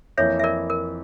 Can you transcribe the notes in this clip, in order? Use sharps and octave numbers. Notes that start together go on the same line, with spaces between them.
F2 E3 A#3 E4 C#5 E5
E5
A#4 D5
A#4